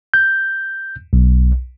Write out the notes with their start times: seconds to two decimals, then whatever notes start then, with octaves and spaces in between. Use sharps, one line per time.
0.14 G6
1.13 B1